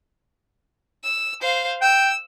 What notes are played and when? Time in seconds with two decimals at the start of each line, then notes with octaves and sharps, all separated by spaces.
1.04 E6
1.41 C5 F5
1.82 G5 E6